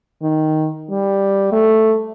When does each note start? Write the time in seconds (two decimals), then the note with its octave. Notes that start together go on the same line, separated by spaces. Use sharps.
0.22 D#3
0.91 G3
1.52 A3